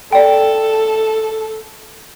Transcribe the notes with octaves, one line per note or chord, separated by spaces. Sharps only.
A4 D5 G5